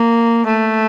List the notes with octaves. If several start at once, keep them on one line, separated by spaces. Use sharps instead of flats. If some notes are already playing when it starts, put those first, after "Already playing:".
Already playing: A#3
A3